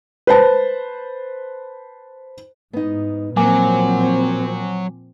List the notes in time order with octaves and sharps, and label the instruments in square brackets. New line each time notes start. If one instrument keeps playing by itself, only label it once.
[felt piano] B4 C5 A5
[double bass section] G#2 [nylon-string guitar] B3 D#4
[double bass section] A#2 F3 C4 [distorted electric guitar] F#3 [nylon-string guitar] A#3 [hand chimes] G#5 D6